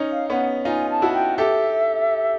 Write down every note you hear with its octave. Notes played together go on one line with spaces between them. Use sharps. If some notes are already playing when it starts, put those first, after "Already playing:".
Already playing: C#4 D#4
F5
B3 C#4 F#5
D#4 F4 G#5
A5
E4 F#4
G5
G4 A4 E5